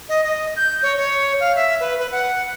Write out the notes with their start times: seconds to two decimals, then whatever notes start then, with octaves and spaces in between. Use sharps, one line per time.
0.09 D#5
0.24 D#5
0.56 G6
0.83 C#5
0.97 C#5
1.40 F5
1.55 E5
1.80 B4
1.99 B4
2.12 F#5